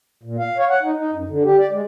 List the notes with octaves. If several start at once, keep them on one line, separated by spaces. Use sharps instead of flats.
A#2
F5
C#5
F#5
D#4
D#4
F#2
D3
G4
D5
G#3